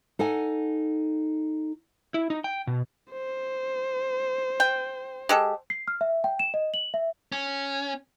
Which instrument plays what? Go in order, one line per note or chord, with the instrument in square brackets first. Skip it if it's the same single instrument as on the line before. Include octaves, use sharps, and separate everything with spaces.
[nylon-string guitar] D#4 A4 F#5 G#5
[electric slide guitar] E4
D#4
G5
B2
[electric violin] C5
[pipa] G5
G#3 G4 A4
[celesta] C7
F6
E5
G5
E7
D#5
F#7
E5
[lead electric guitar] C#4